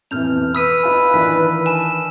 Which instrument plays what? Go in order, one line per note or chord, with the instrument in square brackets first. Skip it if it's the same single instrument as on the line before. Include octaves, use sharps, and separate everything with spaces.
[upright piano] F2 B2 E3 [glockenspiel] F6 G6 F7
[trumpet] B4 [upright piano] D#6 [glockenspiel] E6 B6 D#7
[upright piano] D#4 F4 G#5
[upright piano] D#3 E3 D4 [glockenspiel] B6
[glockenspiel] G#5 A5 E7